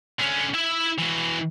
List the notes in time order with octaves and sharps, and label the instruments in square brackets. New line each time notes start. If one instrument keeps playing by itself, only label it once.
[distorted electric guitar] D3 C#4
E4 E5
E3 F#4